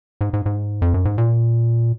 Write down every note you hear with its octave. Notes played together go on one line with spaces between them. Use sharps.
G#2
G#2
G#2
F2
F#2
G#2
A#2